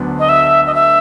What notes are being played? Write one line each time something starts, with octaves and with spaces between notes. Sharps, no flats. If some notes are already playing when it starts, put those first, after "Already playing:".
Already playing: D2 D3 F#3 B3 D4
D#5
E5
D#5
E5